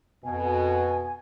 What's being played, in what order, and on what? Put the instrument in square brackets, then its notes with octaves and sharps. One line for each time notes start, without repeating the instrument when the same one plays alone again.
[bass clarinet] F2 [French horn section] B2 [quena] G#5